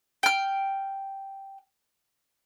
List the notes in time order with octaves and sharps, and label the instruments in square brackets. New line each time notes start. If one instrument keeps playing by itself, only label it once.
[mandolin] G5 F6